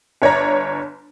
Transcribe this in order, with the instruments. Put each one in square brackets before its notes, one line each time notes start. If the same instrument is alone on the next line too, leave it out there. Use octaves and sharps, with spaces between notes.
[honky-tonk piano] G1 C#5 D5 A#5